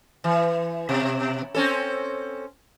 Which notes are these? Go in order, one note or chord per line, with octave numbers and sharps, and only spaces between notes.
E3
B2
C4 C#4 A4